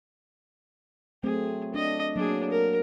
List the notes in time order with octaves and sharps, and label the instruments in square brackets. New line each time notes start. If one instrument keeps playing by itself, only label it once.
[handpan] F#3 A3 C4 [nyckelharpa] G#4
[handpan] D4 [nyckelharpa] D#5
[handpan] F#3 A#3 [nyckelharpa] D4 G#4
[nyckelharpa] A#4